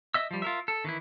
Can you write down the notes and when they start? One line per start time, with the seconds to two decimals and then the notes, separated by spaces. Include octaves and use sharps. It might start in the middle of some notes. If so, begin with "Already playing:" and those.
0.14 D#5 E5 E6
0.31 F3 G3
0.42 F4 A#4 E5
0.68 A4
0.85 D#3 E3 E4